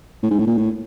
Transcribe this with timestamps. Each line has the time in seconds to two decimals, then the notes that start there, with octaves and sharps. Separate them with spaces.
0.23 A2
0.31 G#2
0.39 A2
0.47 A#2
0.58 A2